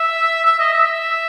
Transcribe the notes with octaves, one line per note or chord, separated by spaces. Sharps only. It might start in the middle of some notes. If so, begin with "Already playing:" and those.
Already playing: E5
E5
D#5
E5